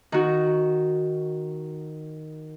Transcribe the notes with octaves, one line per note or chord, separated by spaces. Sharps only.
D#3 F#4